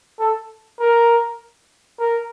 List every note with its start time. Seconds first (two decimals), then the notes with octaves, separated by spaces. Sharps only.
0.20 A4
0.80 A#4
2.00 A#4